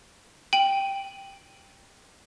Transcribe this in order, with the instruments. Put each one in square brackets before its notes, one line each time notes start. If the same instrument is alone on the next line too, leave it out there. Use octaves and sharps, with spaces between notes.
[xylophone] G5 D7 D#7 F#7